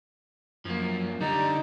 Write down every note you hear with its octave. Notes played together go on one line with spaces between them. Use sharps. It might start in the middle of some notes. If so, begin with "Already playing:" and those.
F#2 F3 A#3
D3 G3 D#4